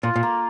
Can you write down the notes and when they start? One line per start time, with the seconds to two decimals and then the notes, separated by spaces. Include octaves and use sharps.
0.03 A#2 F4
0.16 A#2
0.23 A#3